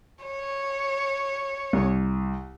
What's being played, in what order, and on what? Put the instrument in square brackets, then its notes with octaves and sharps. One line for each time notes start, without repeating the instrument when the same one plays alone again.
[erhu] C#5
[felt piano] C2